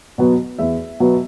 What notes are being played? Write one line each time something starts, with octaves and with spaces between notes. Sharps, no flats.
B2 F#3 B3
E2 E5
B2 F#3 B3